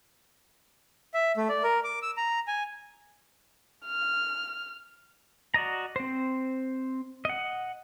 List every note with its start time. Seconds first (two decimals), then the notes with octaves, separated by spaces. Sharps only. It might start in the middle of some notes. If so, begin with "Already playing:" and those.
1.14 E5
1.37 A3
1.49 D5
1.63 A#4
1.84 D6
2.02 E6
2.17 A#5
2.47 G#5
3.86 F6
5.54 F#4 D5 D#5 A#5
5.96 C4 C5
7.25 D#5 F#5